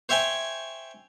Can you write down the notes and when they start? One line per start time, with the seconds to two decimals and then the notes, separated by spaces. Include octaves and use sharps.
0.09 C5 C#5 E5 G5 G#5